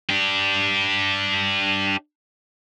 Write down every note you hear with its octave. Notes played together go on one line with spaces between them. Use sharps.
D4 G4